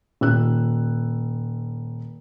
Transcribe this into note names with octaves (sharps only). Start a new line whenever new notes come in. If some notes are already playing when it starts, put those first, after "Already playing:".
D#1 E6 F#6